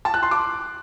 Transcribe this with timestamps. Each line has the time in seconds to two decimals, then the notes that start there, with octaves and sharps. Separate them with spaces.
0.05 A5
0.14 F#6
0.23 C6
0.31 D6